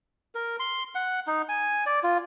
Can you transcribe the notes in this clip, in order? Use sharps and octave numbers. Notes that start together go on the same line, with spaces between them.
A#4
C6
F#5
D#4
G#5
D5
F4